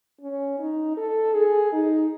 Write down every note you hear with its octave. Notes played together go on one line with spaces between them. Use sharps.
C#4
D#4
A4
G#4
D#4